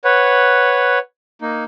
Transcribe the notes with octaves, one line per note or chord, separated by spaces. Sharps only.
B4 C#5 F#5
A#3 D#4